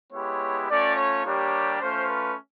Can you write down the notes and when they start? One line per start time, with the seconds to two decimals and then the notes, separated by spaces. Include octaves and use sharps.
0.12 G#3 B3 E4 G4 C#5
0.68 A3 C#4 F4 D5
0.96 C#5
1.24 G3 A#3 D4 G4 C#5
1.80 A3 C#4 F4 C5
2.08 B4